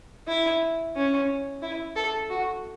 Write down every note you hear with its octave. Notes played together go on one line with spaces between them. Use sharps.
E4
C#4
E4
A4
F#4